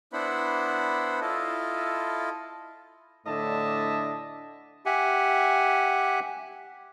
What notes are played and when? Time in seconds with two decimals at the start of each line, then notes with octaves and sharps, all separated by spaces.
0.13 B3 D4 E4 C5 F#5 B5
1.21 E4 F4 A4 D#5
3.25 A2 D3 D4 D#5 E5 A5
4.86 G4 E5 F#5 G#5